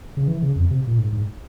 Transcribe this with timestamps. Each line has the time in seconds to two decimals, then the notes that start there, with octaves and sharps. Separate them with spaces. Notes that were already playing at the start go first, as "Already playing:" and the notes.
0.17 C#3
0.28 E3
0.42 C#3
0.56 F2
0.70 C3
0.87 A#2
0.98 G#2
1.12 G#2